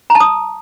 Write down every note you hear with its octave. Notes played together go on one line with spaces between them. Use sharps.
A#5
A5
D#6